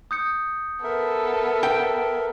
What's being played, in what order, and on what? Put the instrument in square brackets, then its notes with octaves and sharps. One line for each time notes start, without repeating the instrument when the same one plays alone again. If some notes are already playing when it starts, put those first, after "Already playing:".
[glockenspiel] D#6 G6 C#7
[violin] B3 A4 [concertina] A#4 E5
[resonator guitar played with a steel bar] G5